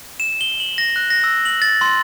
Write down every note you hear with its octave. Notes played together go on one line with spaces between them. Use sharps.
E7
G7
F#7
A#6
F#6
A#6
E6
F#7
A6
C6